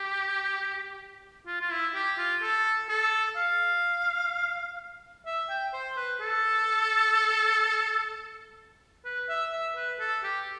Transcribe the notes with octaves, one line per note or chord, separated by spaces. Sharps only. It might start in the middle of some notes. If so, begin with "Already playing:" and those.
Already playing: G4
F4
F4
E4
G4
F4
A4
A4
F5
E5
G5
C5
B4
A4
B4
E5
E5
B4
A4
G4